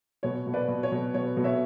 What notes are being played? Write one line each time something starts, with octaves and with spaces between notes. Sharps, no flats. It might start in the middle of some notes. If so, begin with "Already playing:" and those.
B2 C#5
B2
B4 D5
B2
C#5
B2
B2 C#5
B2
C#5 E5